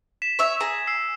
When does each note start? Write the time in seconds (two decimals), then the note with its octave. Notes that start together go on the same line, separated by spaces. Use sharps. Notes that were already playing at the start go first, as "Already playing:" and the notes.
0.22 B6 E7
0.39 C#5 E5
0.60 G#4 A#5
0.87 E6 C7